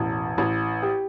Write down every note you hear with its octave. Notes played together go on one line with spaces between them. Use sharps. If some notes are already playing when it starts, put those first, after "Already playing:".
Already playing: E1 A1
A1
G4